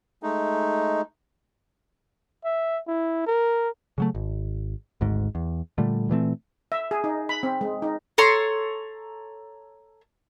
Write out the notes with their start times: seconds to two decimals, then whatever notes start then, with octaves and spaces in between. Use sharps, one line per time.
0.23 G#3 A3 D#4
2.45 E5
2.87 E4
3.27 A#4
3.98 C#3 F#3 A3
4.15 G#1
5.01 G#1 D2 G#2
5.35 E2
5.78 A#2 D3 G3 A3
6.09 A#2 E3 A3 C4
6.72 E5
6.91 G#4
7.04 D#4
7.29 B5
7.43 C4
7.61 G#3
7.82 D#4
8.18 A4 C#5 A#5 C6